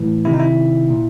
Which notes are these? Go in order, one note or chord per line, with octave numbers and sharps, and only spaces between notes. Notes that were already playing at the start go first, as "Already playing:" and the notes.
Already playing: A2 E3
C3 D#3 E4
D#4
E4
A#2